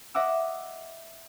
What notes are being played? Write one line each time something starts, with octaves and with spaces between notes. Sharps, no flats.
D#5 E5 F#5 D6 E6